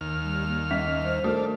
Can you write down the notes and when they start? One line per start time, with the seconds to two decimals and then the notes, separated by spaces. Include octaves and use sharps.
0.01 D#2 F6
0.22 G3
0.48 A#3
0.71 G3 D#5 B6 F7
1.04 C5
1.24 A3 D4 F#4 A#4